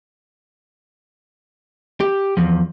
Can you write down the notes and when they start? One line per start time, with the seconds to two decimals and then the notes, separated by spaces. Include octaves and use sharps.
2.00 G4
2.37 E2 F3